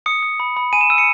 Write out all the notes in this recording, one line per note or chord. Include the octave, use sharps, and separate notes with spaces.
D#6 C#7
D#6
B5
B5
G#5 D#7
E7
E6 D#7
C#7